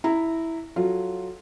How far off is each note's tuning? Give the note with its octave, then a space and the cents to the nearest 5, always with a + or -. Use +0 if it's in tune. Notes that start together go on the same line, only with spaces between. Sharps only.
E4 -5 A#5 -15
F#3 +0 F4 +0 A4 +0